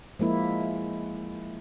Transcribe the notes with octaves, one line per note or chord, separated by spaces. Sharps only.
F3 G#3 A#3 E4